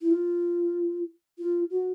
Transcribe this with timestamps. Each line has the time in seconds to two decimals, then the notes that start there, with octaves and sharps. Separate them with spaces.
0.01 E4
0.11 F4
1.38 F4
1.70 F#4